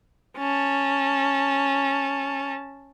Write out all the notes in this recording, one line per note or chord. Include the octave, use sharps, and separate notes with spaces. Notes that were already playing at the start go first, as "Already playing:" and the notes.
C#4 A5